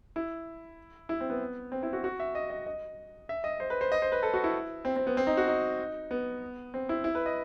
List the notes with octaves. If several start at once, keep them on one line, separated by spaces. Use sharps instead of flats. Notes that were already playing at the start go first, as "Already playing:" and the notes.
E4
E4
C4
B3
C4
E4
F#4
F#4
E5
D#5
D#5
D#5
E5
D#5
C5
B4
C5
D#5
C5
B4
A4
F#4
E4
C4
C4
B3
C4
D#4
F#4
D#4
B3
C4
E4
E4
B4
D#5